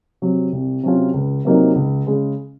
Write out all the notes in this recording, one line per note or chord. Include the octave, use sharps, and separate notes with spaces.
C3 F#3
C2
C3 F#3 C#4 F4
C#2
C3 F#3 A#3 D#4
C#2
C#3 G#3